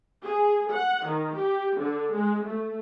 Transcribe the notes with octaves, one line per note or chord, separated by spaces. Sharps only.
G#4
F#5
D#3
G4
D3
G#3
A3